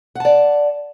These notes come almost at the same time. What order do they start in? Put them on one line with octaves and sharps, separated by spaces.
F#5 A5 D5